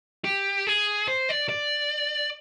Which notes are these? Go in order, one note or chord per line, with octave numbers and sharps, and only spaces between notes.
G4
G#4
C5
D5
D5